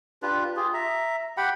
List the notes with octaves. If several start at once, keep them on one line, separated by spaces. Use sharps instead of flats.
D4 F4 G4 B4
F4 G4 G#4
E5 A#5
G4 F#5 G5 B5